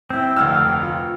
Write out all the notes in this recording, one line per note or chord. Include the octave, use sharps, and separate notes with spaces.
C4 E4 G5
F1 D2 F5 E6
F4